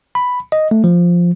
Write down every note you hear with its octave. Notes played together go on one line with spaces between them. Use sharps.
B5
D#5
A3
F3